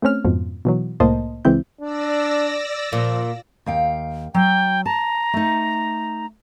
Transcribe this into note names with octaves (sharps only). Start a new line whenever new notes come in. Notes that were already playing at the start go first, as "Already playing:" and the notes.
A3 C4 C#4 F6
F2 G#2 B2 F3
B2 E3 F#3
C2 A2 A#3 C5 D#5 A5
C#2 E3 G#3 C4 E4 G6
D4 D5 E6 A#6
A#2 F3
D#2 F5 G5
F#3 G5
A5 A#5
A3 D#4